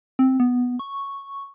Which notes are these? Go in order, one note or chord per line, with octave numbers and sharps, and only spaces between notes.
C4
B3
C#6